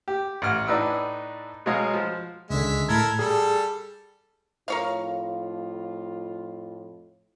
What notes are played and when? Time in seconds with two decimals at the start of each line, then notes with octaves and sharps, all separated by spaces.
0.08 G4
0.42 A1 F5 F#5 F6
0.68 A2 D4 D#4 B4 E6
1.66 B2 F#3 G#3 C#5 D#5 F5
1.94 F3
2.50 C#2 D3 G#3 E5
2.89 A2 E4 A4 A#4 G#6
3.19 G3 G#4 A4
4.68 F2 A2 F4 A#4 C#5 F5